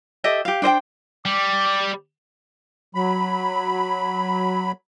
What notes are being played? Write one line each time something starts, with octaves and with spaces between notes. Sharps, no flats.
G4 A4 D#5 E5
G4 F5
D4 C5 D#5 G5
G3 D6
F#3 B5